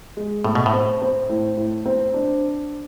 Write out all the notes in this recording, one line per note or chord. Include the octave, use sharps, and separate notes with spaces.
G#3
A2 A3
B2
A2
C4
C4
A2
A2
C4
D4